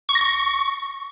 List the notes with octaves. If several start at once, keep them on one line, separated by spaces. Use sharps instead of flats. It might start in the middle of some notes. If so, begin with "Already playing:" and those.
C#6
A#6
C#6